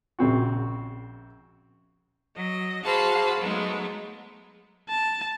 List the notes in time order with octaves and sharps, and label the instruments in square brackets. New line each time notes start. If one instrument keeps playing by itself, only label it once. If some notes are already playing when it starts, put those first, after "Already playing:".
[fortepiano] A#1 C#3 C4 F#4
[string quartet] F#3 D#5
F#4 G#4 C5 F5 A5 B5
F#3 G#3 A3 B3 D#4
[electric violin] A5